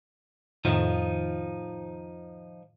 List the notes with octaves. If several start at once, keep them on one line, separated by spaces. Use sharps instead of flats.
F2 A2 D#3 F3 D#4